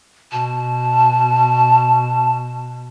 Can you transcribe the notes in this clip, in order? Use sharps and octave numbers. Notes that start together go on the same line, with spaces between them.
B2 A5